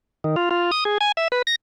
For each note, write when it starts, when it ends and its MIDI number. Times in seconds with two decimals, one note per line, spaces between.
0.24 0.36 51
0.36 0.49 65
0.51 0.71 65
0.72 0.84 87
0.85 0.98 68
1.01 1.12 80
1.17 1.28 76
1.32 1.42 71
1.47 1.55 94